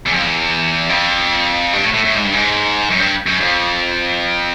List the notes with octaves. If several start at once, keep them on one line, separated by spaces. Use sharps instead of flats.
E2
F2
E2
F2
G2
A2
A2
A2
G#2
G2
G#2
F#2
G2
F#2
F2